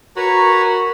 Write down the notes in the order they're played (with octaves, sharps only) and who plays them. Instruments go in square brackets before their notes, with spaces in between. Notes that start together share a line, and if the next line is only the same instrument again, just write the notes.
[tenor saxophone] F#4 [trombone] A#4 [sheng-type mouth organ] B4 C#5 A#5